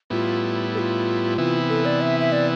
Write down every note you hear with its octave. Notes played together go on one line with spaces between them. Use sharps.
A2 G3 B3 E4 F4
A4
F4
C3 E3 B3 E4
A4
D5
E5
E5
D5